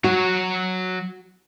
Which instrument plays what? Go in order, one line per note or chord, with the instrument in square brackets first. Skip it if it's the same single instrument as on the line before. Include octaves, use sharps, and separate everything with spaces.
[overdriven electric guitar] F#3 C#5 [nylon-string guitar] F#4